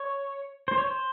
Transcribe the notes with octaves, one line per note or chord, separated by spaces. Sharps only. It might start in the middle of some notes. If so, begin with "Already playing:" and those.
Already playing: C#5
C5
C#5
C5